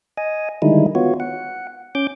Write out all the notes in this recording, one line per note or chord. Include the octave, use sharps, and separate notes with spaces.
D#5 G#5
D3 D#3 G3 G#3 D#4 E4
B3 F4 F#4 C#5
F#5
C#4 D6 G6